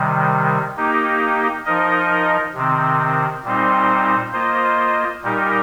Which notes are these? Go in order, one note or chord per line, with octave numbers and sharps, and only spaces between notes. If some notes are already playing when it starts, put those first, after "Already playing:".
Already playing: C3 D#3 G3
A#3 D#4 G4
F3 D#4 A#4 D#5
C3 D#3 C4
A#2 G3 C4 D#4 C5
A#3 F4 C5 D#5
A#2 G3 D#4 G4 A#4